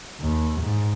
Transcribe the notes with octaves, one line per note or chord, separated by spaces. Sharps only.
D#2
G#2